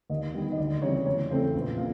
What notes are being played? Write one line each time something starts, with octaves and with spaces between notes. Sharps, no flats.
D#2 D#5
D#3 G3 B3
D#5
D2 D5
C#3 E3 G3 C4 C#5
E2 C#5
C#3 E3 A3 C4 C5
A#1 B4
A#2 F5